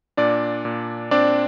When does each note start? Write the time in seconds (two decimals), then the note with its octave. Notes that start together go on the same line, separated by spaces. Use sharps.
0.17 A#2 D4 D5
0.65 A#2
1.11 C4 D4 D5